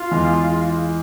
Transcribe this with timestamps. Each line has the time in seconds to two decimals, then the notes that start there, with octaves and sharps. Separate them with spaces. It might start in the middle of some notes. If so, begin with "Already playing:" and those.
Already playing: F4
0.11 E2 E3 G#3